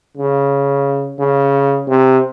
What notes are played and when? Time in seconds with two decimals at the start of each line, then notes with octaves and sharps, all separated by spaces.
0.17 C#3
1.19 C#3
1.88 C3